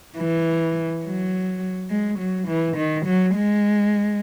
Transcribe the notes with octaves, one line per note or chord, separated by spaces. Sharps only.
E3
F#3
G#3
F#3
E3
D#3
F#3
G#3